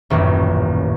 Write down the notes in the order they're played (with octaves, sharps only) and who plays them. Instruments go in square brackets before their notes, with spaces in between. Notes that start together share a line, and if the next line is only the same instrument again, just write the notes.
[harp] D#1 A1 F#2 A#2